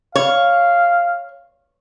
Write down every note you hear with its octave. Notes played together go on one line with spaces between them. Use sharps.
C#5 F5